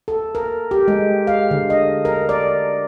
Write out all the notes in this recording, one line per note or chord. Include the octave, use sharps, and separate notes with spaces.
A4
A#4
G4
G#3
F5
D3
D#5
A#4
D5